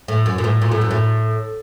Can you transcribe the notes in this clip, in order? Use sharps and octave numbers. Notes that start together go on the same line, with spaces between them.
A2
F#2
A#2
A2
A#2
A2
F#2
A2